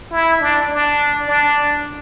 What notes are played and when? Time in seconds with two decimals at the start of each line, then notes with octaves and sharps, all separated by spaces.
0.12 E4
0.41 D4
0.70 D4
1.27 D4